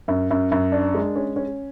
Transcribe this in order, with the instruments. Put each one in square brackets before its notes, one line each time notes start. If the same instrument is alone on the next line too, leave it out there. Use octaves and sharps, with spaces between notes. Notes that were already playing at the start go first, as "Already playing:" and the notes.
[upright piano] F#2
F#2
F#2
D4
G#3
C#4
C#4